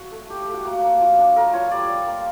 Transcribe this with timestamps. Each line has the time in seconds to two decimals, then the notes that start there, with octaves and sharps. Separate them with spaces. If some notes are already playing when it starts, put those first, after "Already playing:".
Already playing: F#4
0.11 A3
0.29 A3 G4
0.42 G4
0.48 A3
0.53 F#4
0.65 A#3 F#4
0.83 A#3
1.00 F3
1.18 D4
1.36 A3 A#4
1.53 F4 C#5
1.71 G3 D5
1.89 G3
2.07 A#3